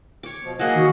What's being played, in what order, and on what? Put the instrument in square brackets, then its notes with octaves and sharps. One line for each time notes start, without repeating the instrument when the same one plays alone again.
[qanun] C#5 D6
[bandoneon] B2 F3
[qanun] F#3 A#3 [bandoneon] G#4 D#5 F#5
[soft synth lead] D#3 [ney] F#4